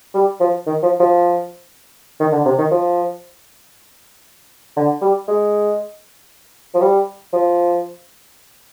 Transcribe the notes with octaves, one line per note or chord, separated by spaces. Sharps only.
G3
F3
D#3
F3
F3
D#3
D3
C3
D#3
F3
D3
G3
G#3
F3
G3
F3